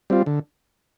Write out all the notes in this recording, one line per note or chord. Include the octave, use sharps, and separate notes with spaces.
G3 C4 F4
D3